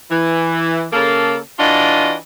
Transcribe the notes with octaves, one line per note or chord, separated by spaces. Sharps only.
E3
C#3 A#3 A4
E3 D4 F4 F#4 D5 D#5